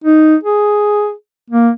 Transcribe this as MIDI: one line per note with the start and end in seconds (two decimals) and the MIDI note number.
0.04 0.36 63
0.44 1.12 68
1.50 1.70 58